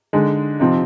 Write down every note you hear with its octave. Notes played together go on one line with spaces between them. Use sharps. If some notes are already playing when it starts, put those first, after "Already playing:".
D3 G#3 D#4
C3 F3 C4 D#4